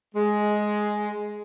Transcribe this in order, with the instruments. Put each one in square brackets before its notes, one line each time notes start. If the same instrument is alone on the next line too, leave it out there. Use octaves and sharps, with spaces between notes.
[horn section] G#3